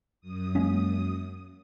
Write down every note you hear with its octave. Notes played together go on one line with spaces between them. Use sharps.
F#2 D#6
G#3 A#3 C#4